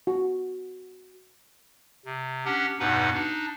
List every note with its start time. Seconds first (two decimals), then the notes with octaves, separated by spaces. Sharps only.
0.07 F#4
2.05 C3
2.45 C#4 D4 G4 F#5
2.79 E2 G2 B2 D#4 B4 F#5
3.14 D4 D#4